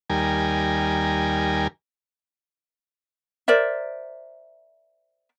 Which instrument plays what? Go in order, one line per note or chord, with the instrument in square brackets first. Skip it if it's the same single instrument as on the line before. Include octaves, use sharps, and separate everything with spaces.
[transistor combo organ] D#2 G3 A#4 G#5
[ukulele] A#4 C5 D5 E5